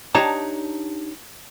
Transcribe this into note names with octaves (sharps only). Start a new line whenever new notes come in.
D4 D#4 G4 C#5 A5 A#5